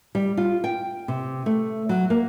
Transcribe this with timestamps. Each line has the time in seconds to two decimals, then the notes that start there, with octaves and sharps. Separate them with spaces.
0.15 G3
0.37 F4
0.64 G5
1.08 C3
1.46 A3
1.89 F#3
2.10 A#3